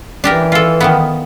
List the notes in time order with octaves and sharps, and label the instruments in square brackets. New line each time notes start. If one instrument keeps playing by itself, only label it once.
[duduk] E3 [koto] D4 G4 A#4
[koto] F4 A4
D#3 F3 B3